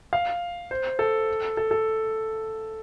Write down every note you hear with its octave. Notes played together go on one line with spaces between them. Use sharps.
F5
C5
A4
A4
A4